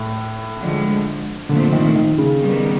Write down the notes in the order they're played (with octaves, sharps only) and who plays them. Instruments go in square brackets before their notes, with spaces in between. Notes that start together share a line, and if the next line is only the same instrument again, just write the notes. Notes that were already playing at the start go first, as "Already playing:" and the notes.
Already playing: [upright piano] A2
[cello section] D3 F3 G#3
[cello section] A#2 F3 A3 C4 [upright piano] D3
[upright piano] D#3
D#3
C#3
[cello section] D#3 G3 B3